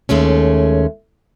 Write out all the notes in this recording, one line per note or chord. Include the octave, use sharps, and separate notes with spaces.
D#2 G#3 A3 C#4